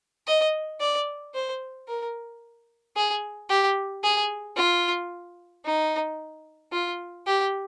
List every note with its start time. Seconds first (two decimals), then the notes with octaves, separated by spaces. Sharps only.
0.27 D#5
0.81 D5
1.34 C5
1.88 A#4
2.96 G#4
3.50 G4
4.03 G#4
4.57 F4
5.65 D#4
6.73 F4
7.26 G4